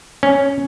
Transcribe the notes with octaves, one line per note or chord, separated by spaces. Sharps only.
C#4